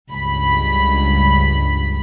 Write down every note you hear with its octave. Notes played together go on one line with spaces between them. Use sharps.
C#2 G2 B5